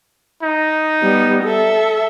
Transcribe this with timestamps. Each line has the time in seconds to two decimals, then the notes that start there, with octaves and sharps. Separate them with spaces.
0.43 D#4
1.02 G3 B3
1.44 A4 E5